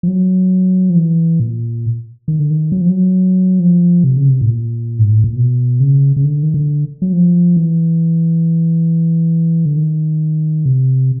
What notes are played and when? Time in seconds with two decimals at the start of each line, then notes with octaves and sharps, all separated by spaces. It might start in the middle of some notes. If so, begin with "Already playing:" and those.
0.03 F3
0.08 F#3
0.90 F3
0.96 E3
1.40 A#2
2.28 D#3
2.39 D3
2.51 D#3
2.72 F#3
2.81 F3
2.89 F#3
3.60 F3
4.04 C3
4.16 C#3
4.29 C3
4.41 A2
4.48 A#2
4.99 G#2
5.12 A2
5.24 A#2
5.36 B2
5.80 C#3
6.16 C#3
6.24 D3
6.43 D#3
6.54 D3
7.02 F#3
7.13 F3
7.57 E3
9.66 D3
9.77 D#3
10.65 C3